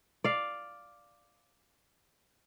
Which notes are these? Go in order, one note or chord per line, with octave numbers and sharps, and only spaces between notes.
D5 F5